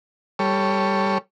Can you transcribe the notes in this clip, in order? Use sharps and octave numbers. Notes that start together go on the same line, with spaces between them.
G3 A4 C#5